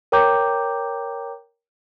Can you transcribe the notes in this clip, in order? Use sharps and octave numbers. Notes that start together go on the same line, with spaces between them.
A#4 C#5 G5 A#5 D6 G6